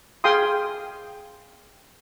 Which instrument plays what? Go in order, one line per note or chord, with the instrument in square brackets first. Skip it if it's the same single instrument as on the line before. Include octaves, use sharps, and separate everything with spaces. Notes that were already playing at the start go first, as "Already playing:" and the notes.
[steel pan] G#4 F5 G5 C6 D#6